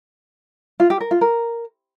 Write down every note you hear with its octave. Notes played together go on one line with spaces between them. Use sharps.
F4
G4
A#4
F4
A#4